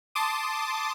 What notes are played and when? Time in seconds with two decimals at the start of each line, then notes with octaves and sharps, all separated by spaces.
0.15 A5 C6 D6 D#6